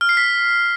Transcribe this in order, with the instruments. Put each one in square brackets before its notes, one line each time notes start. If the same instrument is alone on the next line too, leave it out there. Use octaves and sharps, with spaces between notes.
[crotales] F6
C7
B6